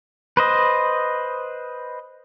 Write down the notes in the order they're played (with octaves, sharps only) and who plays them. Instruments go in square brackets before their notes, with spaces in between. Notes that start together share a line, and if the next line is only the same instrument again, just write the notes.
[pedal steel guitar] B4 C5 D#5